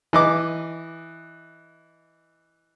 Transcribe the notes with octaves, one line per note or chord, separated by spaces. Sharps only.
E3 D#5 D6